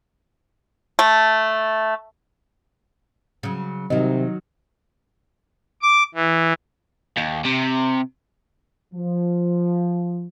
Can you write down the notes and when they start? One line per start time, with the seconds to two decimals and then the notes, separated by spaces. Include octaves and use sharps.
0.99 A3
3.43 C#3 F#3
3.90 C3 D#3 F#3 D#4 D#5
5.82 D6
6.14 E3
7.17 D#2
7.45 C3
8.94 F3